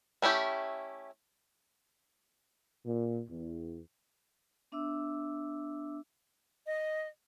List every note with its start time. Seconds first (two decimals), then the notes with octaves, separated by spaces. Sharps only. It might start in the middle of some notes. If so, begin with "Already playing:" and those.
0.22 A3 C#4 E4 G4
2.86 A#2
3.29 E2
4.72 B3 D4 E5 D6 E6
6.66 D#5